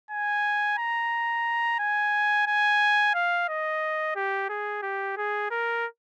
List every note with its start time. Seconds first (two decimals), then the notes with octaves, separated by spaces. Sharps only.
0.11 G#5
0.78 A#5
1.79 G#5
2.47 G#5
3.14 F5
3.48 D#5
4.16 G4
4.49 G#4
4.82 G4
5.17 G#4
5.51 A#4